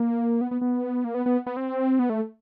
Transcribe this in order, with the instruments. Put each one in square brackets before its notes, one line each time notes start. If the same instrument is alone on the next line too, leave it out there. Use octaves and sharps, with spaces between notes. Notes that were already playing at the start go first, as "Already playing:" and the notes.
Already playing: [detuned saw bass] A#3
B3
B3
B3
A#3
B3
B3
B3
C4
B3
A3